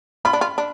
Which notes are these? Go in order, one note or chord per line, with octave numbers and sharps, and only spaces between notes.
F4 B5
D4
F4
D4